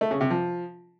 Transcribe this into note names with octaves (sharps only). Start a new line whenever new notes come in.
A3
C#3
C3
F3